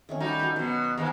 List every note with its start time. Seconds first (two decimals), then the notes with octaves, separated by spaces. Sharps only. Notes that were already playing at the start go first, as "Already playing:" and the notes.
0.09 D#3 A3 C#4
0.20 G3 D#4 F#4
0.39 F#4 G#4 B4
0.56 B2 F#3 B3
0.98 D#2 G#2 G#3 F5